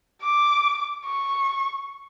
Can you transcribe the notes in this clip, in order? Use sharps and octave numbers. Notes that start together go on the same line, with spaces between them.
D6
C#6